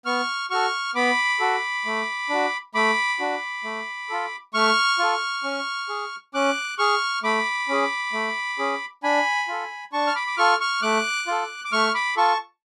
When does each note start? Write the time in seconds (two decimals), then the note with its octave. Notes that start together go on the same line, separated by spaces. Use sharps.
0.05 B3 C#6 F6
0.50 F#4 A4 C#6 F6
0.95 B3 B5 D6
1.40 F#4 A4
1.86 A3
2.30 D4 F#4
2.75 A3 B5 D6
3.19 D4 F#4
3.64 A3
4.10 F4 A4
4.54 A3 C#6 F6
4.99 F4 A4
5.44 C#4
5.89 G#4
6.34 C#4 D6 F#6
6.78 G#4 C#6 F6
7.23 A3 B5 D6
7.69 C#4 G#4
8.13 A3
8.59 C#4 G#4
9.03 D4 G#5 B5
9.48 F4 A4
9.93 D4 A5 C#6
10.07 F6
10.15 B5 D6
10.27 D6
10.37 F4 A4 C#6 F6
10.60 C#6 F6
10.82 A3 D6 F#6
11.27 F4 A4
11.65 D6
11.72 A3 C#6 F6
11.94 B5 D6
12.17 F4 A4 A5 C#6